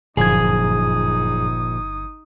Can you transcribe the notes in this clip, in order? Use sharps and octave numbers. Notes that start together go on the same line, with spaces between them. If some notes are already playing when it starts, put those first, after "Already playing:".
G1 F#2 A#2 F3 D#4 G#4 D#6 G#6